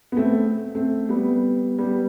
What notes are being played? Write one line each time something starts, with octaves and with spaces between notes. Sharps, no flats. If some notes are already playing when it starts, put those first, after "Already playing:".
B3
A3 C4
A3 C4
G3 B3
G3 B3